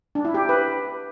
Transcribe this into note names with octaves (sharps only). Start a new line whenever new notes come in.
D4
E4
G4
B4